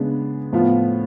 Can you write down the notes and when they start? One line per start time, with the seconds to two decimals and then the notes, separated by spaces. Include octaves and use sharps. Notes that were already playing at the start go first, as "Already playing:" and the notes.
Already playing: C#3 G#3 B3 D4
0.53 A2 F3 B3 F4